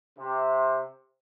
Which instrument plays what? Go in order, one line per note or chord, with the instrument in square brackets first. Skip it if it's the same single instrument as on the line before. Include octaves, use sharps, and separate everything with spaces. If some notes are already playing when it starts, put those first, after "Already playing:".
[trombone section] C3